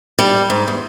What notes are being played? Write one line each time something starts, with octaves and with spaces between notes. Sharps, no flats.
G3
G#2
E2